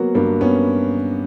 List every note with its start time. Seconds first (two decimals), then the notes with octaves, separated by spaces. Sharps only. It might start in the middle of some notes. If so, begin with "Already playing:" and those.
Already playing: F#3 A#3 B3 F#4
0.15 G2 A#3
0.41 B3 C#4